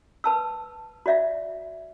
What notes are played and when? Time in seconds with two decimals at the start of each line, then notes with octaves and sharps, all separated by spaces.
0.24 B4 A5 E6
1.06 F#4 D5 E5 F5